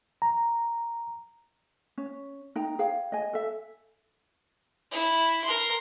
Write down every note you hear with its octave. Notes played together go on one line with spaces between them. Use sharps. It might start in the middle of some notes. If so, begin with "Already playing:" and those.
A#5
C#4
D#4 G5 A#5
G#4 C5 F5 G5
D#5 G#5
A4 E5
E4
A#4 C6